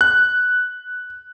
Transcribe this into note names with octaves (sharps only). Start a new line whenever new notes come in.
F#6